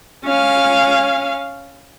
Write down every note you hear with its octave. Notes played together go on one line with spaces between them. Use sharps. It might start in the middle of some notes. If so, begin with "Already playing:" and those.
C#4 F5